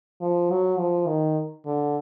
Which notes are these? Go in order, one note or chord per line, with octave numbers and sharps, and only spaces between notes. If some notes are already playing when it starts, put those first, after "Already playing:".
F3
F#3
F3
D#3
D3